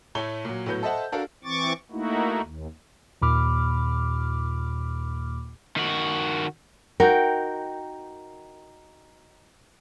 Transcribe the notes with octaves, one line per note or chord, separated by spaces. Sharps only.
A2 A3 C#5 G#6 G7
A#2 F#3
A2 F#3 B3 G6
A4 C5 D#5 E5 F#5 A5
D4 F#4 A4 A#4 F5
E3 C4 C#6 D6 A6
A3 A#3 D#4 E4 F#4
D#2
D#2 A#2 B5 D6 F6
D#3 F#4
D#4 F#4 A#4 G5